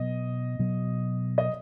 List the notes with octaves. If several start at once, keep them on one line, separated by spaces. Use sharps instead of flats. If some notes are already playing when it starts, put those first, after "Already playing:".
Already playing: B2 F#3 B3 D#5
B2 F#3 B3
D#5